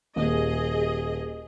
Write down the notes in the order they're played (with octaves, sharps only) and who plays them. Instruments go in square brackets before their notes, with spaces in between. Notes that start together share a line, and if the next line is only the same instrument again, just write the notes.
[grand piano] D#1 D#2 [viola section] G#4 D#5